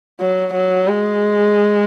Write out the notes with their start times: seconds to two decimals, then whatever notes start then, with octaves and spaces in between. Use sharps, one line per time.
0.20 F#3
0.54 F#3
0.88 G#3